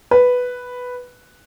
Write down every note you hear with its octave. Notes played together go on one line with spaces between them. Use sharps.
B4